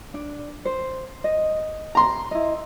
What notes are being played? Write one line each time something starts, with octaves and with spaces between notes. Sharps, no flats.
D4
C5
D#5
A#5 C6
E4 D#5